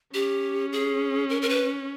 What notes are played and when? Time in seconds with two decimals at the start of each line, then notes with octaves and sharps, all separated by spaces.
0.14 C#4 G4
0.73 G#4
1.30 A#4
1.42 A#4
1.49 B4